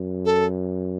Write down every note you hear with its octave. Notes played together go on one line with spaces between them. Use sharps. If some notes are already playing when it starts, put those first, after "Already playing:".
Already playing: F#2
A4